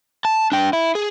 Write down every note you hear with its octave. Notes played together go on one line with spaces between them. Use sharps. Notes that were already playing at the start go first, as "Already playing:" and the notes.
A5
D4 G5
E4
G#4